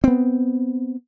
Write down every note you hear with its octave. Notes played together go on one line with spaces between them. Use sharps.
B3 C4